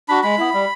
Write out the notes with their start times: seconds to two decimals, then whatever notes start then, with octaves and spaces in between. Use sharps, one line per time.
0.08 D4 F#4 B5
0.23 G#3 B5
0.38 B3 E4
0.53 G3